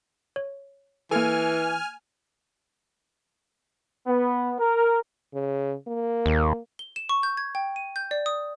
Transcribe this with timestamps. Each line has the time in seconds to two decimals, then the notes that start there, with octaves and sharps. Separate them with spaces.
0.36 C#5
1.11 E3 A#3 A4 G#5 F6
4.07 B3
4.59 A#4
5.34 C#3
5.87 A#3
6.26 D#2
6.79 G7
6.96 E7
7.09 C#6
7.23 G6
7.37 G#6
7.55 G5
7.76 D#7
7.96 G6
8.11 D5
8.26 D#6